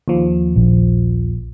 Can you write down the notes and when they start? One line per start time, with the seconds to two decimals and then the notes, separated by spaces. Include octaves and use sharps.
0.08 D#2 F3
0.56 A#1